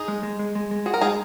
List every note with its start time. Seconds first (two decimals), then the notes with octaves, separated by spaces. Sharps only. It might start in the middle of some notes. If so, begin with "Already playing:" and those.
Already playing: D#4 G#4
0.08 G#3
0.23 G#3
0.39 G#3
0.55 G#3
0.71 G#3
0.86 F#4 G#4
0.94 A#4
1.01 G#3 D#4 G#4